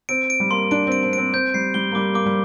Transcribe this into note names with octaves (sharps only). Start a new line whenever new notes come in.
C4 D7
D7
G3
A#3 C6
D4 D7
C4
D7
C4
C4 D7
C4 G6
G3 C7
G3 G7
A#3
G3 D6
A#3 D6
G3